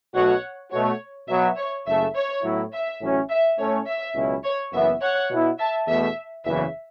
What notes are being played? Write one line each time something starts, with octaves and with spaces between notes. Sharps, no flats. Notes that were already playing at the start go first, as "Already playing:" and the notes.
B1 B2 A3 F#4 C#5 F#5
B2 A3 F#4 C#5
B2 F#3 B3 E5
C#5
F#1 F#2 C#3 A3 E5
C#5
A2 F#3 B3 E4
E5
A1 A2 F#3 C#4 F#4
E5
A2 A3 C#4 C#5
E5
C#2 B2 F#3 C#4 E4
C#5
F#1 F#2 E3 B3 E5
C#5 F#5
B2 B3 E4
E5 A5
E2 B2 A3 E5
F#1 E2 C#3 E3 E5